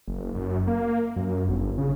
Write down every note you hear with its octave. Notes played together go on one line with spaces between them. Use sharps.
F#1
F#2
A#3
F#2
G1
C#3